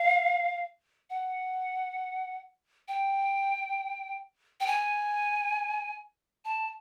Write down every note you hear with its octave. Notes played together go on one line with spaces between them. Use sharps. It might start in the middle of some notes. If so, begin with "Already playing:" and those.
Already playing: F5
F#5
G5
G5
G#5
A5